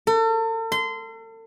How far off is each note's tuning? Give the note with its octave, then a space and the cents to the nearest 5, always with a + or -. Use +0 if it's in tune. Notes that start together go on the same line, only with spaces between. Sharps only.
A4 +40
C6 -25